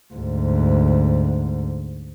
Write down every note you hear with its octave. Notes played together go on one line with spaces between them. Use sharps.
D2 G#2